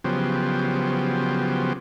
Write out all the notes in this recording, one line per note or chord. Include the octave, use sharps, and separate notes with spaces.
C#3 F3 F#3 B3 G4 C5